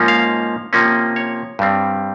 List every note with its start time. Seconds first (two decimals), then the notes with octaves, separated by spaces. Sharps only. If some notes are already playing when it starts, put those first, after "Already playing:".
Already playing: G#2 F3 A#3 C#4
0.08 F5
0.73 C3 F3 A#3 C#4
1.16 C#5
1.59 G2 G3 C4